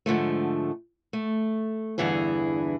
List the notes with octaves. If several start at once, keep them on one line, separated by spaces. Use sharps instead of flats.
G#2 D3 F3 A3
A3
E2 G2 D3 E3 E4 G#4